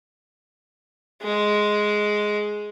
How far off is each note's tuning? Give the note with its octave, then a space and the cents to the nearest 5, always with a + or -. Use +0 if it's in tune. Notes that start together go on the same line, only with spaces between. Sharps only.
G#3 +5